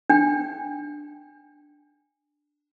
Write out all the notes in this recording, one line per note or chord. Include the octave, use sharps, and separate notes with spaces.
D4 G5